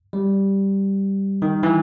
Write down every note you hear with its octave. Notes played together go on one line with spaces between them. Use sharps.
G3
D#3
E3